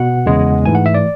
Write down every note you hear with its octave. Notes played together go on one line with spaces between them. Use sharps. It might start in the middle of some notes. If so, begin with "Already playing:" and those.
Already playing: B2 F#5
E2 C#3 G#3 B3
G#2 E3 A3 G#5
F#5
E5
D5